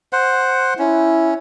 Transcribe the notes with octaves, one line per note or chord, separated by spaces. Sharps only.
C5 F#5
C#4 E4